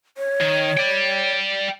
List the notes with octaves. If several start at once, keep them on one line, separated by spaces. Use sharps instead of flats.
C#5
D#3
D5 G5